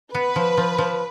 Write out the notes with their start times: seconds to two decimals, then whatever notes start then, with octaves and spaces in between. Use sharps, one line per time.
0.14 B3 B4
0.36 F3
0.57 F3
0.78 F3